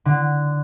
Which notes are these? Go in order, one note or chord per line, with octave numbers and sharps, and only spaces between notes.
D3